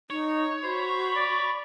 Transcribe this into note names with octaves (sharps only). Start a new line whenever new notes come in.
D#4 C#5
F#4 C5 B5
D5